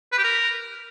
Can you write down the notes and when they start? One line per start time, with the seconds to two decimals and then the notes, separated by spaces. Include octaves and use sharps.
0.12 B4
0.18 G4
0.23 A#4